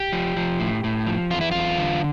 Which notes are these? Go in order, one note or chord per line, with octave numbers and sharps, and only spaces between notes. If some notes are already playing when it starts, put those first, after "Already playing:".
Already playing: G4
F3
F3
A2
A2
F3
E2 F4
E4
E2 F4
D3